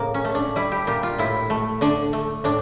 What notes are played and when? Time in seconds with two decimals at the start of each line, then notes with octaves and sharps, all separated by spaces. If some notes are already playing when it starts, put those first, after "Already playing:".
Already playing: A2 C#3 A#3
0.14 C#4
0.25 A3
0.35 D4
0.56 G3 E4
0.72 G4
0.87 A#2 G4
1.03 F4
1.18 A2 E4
1.50 A3
1.81 D3 D4
2.13 A3
2.44 A2 D4